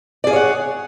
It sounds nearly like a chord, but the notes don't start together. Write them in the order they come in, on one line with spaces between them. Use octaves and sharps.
D5 G#4 F5 C#5 F#5